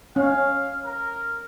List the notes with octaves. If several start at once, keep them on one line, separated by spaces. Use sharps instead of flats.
C#4 F5
A#4